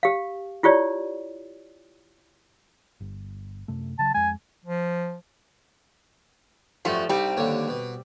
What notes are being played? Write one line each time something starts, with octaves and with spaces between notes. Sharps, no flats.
G4 F5
E4 F4 G4 C#5 D5
G1
F#2 C3 A3
C#3 F#3 A5
F2 G#3 G#5
F3
F#2 F3 G3 A3 F#4
C2 G3 C4 D#4 G4
D#2 D3 C#5
B2